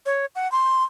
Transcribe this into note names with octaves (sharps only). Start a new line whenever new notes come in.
C#5
F#5
C6